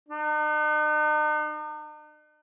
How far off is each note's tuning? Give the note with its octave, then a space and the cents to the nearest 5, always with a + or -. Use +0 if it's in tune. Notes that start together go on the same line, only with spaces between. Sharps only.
D#4 -45